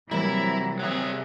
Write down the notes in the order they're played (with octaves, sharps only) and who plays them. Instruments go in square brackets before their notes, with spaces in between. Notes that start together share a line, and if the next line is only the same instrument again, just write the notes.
[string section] C3 E3 F#3 [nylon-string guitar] G3 A#3 C4 [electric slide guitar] E4 [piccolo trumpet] A#5
[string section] C3 [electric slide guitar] F#3 G#4 [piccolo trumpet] E5